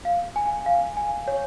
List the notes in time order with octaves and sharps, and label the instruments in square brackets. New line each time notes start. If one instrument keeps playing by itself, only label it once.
[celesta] F5
G#5
F5
G#5
C#5